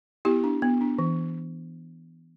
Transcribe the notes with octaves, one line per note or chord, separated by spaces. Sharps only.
B3 E4 G4
D4
B3
D4
E3